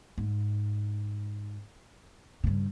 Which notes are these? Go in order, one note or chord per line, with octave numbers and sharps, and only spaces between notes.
G#2
G2 C#3